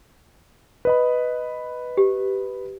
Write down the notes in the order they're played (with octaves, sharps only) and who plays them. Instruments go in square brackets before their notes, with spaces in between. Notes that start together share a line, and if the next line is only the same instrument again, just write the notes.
[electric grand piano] B4 D#5 B5
[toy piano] G4